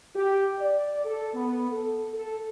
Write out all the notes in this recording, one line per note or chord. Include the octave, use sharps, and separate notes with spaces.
G4
D5
A4
B3
A4
A4